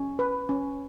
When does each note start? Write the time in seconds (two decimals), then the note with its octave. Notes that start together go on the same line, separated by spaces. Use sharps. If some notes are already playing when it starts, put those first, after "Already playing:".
Already playing: C#4
0.19 B4
0.49 C#4